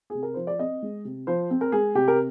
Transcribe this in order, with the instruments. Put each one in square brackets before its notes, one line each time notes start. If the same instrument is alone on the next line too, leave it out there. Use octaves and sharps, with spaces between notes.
[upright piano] C3 G#4
A#4
F3 C5
D5
C4 D#5
G#3
C3
F3 C5
C4
A#4
G#3 G#4
C3 G4
A#4